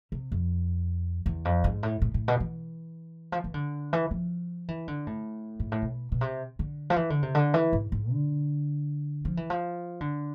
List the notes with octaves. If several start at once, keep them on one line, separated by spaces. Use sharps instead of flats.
C3
F2
E2
F2
G#2
A2
A2
A2
B2
E3
F3
E3
D3
E3
F3
E3
D3
A2
G#2
A2
B2
B2
C3
D3
F3
E3
D3
C3
D3
E3
G#2
G#2
D3
F3
E3
F3
D3